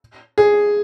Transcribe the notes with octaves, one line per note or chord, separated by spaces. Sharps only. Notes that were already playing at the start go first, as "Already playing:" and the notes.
G#4